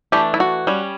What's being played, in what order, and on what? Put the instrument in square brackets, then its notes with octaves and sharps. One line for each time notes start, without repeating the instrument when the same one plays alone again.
[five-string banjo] E3 A3 D4 G4
E4
F#4
G3 C#4